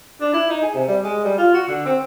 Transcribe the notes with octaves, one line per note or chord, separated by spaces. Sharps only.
D4
E4
D#4
G#4
C3
G3
G#3
G3
F4
F#4
D3
C4